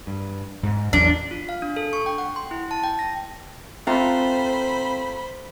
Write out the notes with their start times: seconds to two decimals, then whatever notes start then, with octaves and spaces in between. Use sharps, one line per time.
0.07 G2
0.63 G#2
0.93 A1 E2 F#3 D4
1.31 F4
1.49 F5
1.62 D4
1.76 A4
1.93 C#6
2.06 G5
2.18 F#5
2.36 C6
2.51 E4
2.71 A5
2.84 G5
2.99 A#6
3.87 A3 C4 F4 C5 F5 A#5 B5